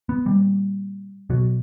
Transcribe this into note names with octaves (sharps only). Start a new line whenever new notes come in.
B3
A#2 G3
B2 F#3